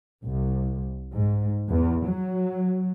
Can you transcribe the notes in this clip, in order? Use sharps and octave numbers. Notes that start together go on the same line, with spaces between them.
C2
G#2
E2
F#3